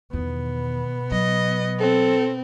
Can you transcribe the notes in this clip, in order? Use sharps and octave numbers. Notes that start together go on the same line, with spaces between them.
E2 B2 D#3 B3
F#3 D#5
C4 A4